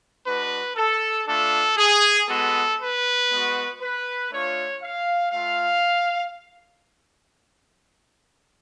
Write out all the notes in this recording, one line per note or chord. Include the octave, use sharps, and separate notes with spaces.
G#3 D4 F#4 B4
A4
A3 D4 F4 A4
G#4
G#3 B3 F#4 A4
B4
G#3 B3 F#4
B4
A3 D4 F4 C#5
F5
A3 F4 F5